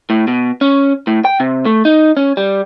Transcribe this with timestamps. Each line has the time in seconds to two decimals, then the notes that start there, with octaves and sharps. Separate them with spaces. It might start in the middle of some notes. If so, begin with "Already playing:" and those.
0.10 A2
0.28 B2
0.61 C#4
1.07 A2
1.25 G5
1.40 C3
1.65 A3
1.85 D#4
2.17 C#4
2.37 G3